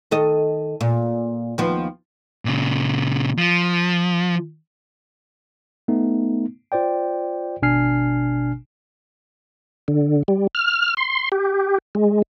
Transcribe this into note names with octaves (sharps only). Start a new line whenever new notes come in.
D#3 A4 D#5
A#2
D#2 F3 B3
A#2 C#3
F3
A3 B3 D#4
F4 C5 D5 G5
G#1 B2 D4 G#5 F6 C7
D3
G3
F6
C6
G4
G#3